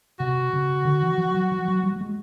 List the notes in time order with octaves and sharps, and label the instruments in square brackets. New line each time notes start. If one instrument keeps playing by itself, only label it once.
[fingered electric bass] C3 [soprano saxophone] F#4
[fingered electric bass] C#3
D3
E3
F3
F#3
F3
F#3
G3
G3
G#3